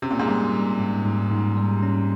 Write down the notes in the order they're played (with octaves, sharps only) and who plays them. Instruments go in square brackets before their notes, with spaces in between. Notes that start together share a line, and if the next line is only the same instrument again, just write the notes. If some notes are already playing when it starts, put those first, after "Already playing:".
[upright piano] C3 [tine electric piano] C#4
[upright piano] A#2
G#2
[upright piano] A#2 [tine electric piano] G3
[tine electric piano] G3
G#2
G#2
G#2
G3
C#4